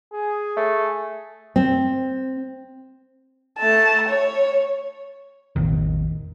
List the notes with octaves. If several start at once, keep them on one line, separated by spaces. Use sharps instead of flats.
G#4
A3
C4
A3 A5
C#5
A1 E2 D#3